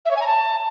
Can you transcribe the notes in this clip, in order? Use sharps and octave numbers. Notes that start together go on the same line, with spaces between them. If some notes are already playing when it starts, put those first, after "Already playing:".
E5
C#5
G#5
A#5
A5